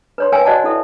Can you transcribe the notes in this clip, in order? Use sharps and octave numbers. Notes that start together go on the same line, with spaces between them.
B4 C#5 C6
A#4 B4 C#5 E5 G5 G#5
F#4 C5 D5 D#5 F#5 A5
E4 A4 E5